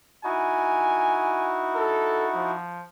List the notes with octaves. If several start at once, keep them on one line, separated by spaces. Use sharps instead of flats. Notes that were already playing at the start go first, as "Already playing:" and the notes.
D#4 E4 F#4 G#5
A4
F3